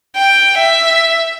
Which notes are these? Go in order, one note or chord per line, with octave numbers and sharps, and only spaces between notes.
G5
E5